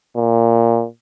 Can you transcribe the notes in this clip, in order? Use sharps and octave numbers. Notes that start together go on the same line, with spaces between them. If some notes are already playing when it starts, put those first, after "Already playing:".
A#2